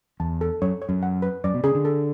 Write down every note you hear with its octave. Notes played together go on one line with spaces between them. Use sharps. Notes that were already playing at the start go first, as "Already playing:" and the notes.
E2 A5
A4
F#2 C#5
C#5
F#2
F#5
B4
F#2 D5
B2
C#3 G#4
D3
A4